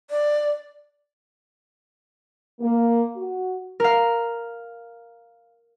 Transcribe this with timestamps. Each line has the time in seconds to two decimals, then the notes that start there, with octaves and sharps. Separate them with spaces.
0.10 D5
2.61 A#3
3.16 F#4
3.80 A#4 F5